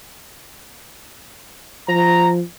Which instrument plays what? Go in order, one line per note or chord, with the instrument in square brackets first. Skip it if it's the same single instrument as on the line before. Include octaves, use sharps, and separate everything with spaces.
[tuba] F3 [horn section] A#5